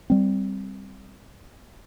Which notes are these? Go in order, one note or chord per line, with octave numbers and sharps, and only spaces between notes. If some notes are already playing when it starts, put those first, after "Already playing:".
G3 C4